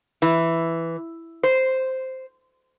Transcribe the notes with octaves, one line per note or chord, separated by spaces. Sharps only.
E3
C5